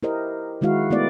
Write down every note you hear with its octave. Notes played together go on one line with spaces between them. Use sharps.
E4 G4 A#4 C5 D#5
D#3 G#3 E4 F#4 F5
A3 B3 E4 D5